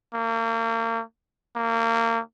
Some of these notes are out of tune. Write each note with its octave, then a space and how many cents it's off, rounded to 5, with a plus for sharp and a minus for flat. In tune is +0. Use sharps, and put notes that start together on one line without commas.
A#3 -35
A#3 -30